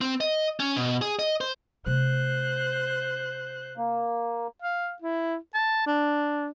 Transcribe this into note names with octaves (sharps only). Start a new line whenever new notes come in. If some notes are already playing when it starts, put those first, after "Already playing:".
C4
D#5
C#4
B2
G#4
D#5
C5
C3 A3 C5 F#6
A#3
F5
E4
A5
D4